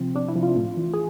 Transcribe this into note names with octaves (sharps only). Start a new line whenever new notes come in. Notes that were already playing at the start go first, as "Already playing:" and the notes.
Already playing: C3 F3 C4
C3 D4
E4
F3
F4
A2
E3
G#4